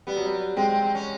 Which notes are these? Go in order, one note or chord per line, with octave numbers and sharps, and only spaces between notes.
G3 B3
F#3
G3
G#3 C4
C4
C4
C#4